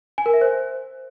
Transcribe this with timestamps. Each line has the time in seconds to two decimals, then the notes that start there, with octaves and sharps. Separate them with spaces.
0.18 G#5
0.26 A#4
0.34 E5
0.41 C5